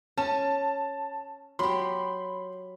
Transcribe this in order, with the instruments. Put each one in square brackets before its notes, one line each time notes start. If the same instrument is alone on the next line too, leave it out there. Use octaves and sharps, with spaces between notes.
[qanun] C#4 [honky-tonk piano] A5
[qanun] F#3 G4 [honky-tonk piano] B5 C6